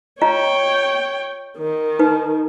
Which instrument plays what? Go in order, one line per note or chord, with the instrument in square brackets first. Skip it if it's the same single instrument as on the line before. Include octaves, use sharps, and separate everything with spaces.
[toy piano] F4 D#5 A#5 [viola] C#5 G5
[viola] D#3
[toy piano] D#4 B4